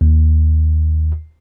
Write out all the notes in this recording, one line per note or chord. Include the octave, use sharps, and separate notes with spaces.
D#2